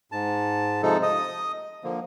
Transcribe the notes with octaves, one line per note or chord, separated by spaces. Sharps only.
G#2 A5
C3 F3 G#3 D#4 A4
D#5 D#6
D3 F3 A#3